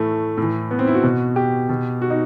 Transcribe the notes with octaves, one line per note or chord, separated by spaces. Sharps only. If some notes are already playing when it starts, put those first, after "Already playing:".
Already playing: A2 E3 A3
A2 E3
B3
C4
E4
F#4
B2
G4
B2
F#4
D#4